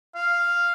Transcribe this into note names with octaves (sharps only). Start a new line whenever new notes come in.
F5